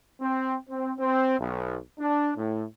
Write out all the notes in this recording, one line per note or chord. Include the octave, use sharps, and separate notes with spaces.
C4
C4
C4
B1
D4
A2